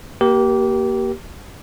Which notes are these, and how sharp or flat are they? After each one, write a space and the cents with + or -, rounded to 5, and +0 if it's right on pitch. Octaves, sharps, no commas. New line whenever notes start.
A#3 +0 G4 -20 A#4 +30